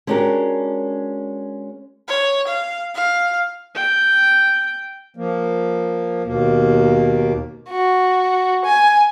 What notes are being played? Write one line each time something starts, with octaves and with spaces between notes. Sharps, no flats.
G#3 C#4 D4 F#4 G4 A#4
C#5
F5
F5
G5
F3 A#3
D#2 B2 A#3
F#4
G#5